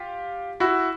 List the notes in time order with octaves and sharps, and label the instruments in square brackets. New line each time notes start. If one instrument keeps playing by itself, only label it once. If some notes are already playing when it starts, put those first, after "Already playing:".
Already playing: [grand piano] F4 G4
E4 F#4